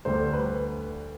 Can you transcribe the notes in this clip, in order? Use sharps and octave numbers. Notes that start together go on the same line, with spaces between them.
D2 D3 G3 C5
B4